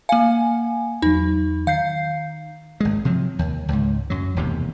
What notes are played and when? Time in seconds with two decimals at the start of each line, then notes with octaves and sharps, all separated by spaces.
0.09 A#3 F5 G#5
1.02 E2 F#3 D#4
1.67 D#3 F5 G6 C7
2.80 G#1 G#3
3.05 C3 F3 F#3
3.39 D#2
3.69 C#2 G#2
4.10 F#2 F#3
4.36 E1 D#2 C3